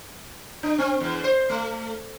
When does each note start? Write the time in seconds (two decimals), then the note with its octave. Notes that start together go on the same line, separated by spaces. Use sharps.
0.63 D4
0.78 C4
1.00 E2
1.24 C5
1.49 A3